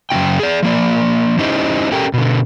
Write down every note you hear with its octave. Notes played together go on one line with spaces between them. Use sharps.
F#2 C#3 A#3 E4 G5
G#4 D5
F3 A#3 D5
C#4 D#4 E4 G4 C5 D#5
C#4 G4 A4 A#4 G5
B2 D3